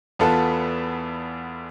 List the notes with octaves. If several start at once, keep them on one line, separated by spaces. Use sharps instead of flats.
E2 B3 F4 A4 F#5 A5